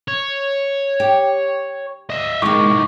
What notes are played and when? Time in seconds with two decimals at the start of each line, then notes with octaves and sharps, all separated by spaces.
0.08 C#5
1.00 G4
2.10 D#5 E5
2.42 A2 D#3 G#3 A#3 C#6 D6